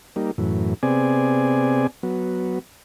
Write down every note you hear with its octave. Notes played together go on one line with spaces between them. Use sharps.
G3 A#3 D#4
F#2 A2 E3
C3 B3 C4 G#4 D5 G#5
F#3 B3